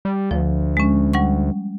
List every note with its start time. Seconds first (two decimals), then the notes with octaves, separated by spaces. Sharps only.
0.05 G3
0.31 D2 F3
0.77 G#3 C#4
1.14 G3 F#5 C#6